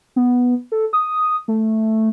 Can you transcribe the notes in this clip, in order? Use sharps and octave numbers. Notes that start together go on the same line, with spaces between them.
B3
A4
D#6
A3